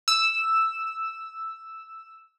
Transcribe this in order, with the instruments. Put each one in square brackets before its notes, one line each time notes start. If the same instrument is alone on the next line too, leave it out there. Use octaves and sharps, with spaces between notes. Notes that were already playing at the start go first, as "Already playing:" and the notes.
[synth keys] E6 E7